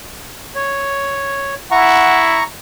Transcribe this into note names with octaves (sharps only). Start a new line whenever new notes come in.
C#5
E4 F#5 A#5 C#6